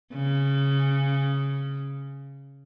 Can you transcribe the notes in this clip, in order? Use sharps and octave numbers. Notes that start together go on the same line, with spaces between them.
C#3